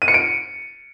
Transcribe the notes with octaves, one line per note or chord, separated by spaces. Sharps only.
D#7
C#7
D7